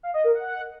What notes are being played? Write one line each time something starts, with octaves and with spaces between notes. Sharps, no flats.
F5
D#5
A#4
F#5